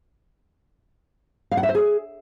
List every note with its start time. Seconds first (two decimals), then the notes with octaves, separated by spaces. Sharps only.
1.51 F5
1.57 F#5
1.63 E5
1.69 C5
1.75 G#4